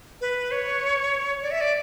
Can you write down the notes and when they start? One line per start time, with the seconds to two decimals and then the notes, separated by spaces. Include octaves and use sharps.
0.21 B4
0.51 C#5
1.43 D5
1.51 E5
1.61 D5